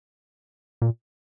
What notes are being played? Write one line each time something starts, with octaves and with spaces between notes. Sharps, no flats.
A#2